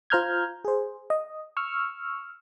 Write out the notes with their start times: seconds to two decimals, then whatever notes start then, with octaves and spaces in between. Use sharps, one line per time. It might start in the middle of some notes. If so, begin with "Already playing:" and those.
0.10 F4 C5 A#5 F6 G6 G#6
0.65 G#4 C5
1.10 D#5
1.57 C#6 E6 F6